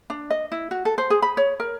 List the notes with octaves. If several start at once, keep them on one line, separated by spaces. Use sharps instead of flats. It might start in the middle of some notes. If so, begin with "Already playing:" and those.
D4
D#5
E4
F#4
A4
C5
G#4
B5
C#5
A#4